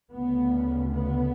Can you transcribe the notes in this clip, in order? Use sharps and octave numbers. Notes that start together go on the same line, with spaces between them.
D2 C#3 B3
B3